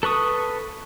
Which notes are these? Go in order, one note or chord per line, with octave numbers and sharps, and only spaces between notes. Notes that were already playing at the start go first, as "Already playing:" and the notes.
A4 B4 C#6 D#6